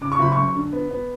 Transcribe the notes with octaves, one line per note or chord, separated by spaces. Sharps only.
C#3 D6
C#6
F#1 B5
F#2 C#6
D3
B3
B3